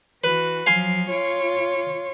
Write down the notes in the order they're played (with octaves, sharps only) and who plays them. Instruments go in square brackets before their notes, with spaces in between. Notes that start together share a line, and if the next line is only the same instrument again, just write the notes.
[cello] E3 F#4 [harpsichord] B4
[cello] F3 F#3 [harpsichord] F5 G#5 C6
[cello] F4 C#5